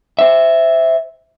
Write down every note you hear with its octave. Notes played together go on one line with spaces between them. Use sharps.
C5 E5